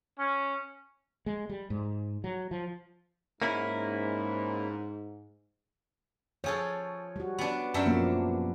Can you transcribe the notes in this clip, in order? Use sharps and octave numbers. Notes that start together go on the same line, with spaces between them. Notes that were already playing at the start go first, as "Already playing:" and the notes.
C#4
G#3
G3
G#2
F#3
F3
G#2 A#3 C#4 E4
F3 G#4 A4 C#5
G3 F#4
B3 D4
F#2 D4 E5
F3 A#3 B3